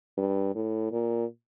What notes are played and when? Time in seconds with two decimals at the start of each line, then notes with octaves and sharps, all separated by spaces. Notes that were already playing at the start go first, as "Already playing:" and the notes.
0.18 G2
0.55 A2
0.92 A#2